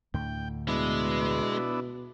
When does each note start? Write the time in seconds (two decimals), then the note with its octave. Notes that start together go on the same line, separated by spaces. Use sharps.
0.14 D2 A2 D3 G5
0.68 B2 G#3 B3 D4 E4